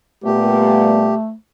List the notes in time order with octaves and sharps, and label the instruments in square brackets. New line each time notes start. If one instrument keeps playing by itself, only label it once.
[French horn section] A#2 G3 B3 [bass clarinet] A3 [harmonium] G4